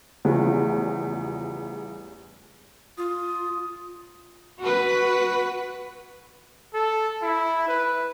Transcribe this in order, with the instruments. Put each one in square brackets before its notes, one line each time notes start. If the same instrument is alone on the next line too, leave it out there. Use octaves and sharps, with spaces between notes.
[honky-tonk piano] A1 E2 C#3 F3 G3
[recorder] F4 [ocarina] D#6
[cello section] F#4 B4
[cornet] A4
E4
B4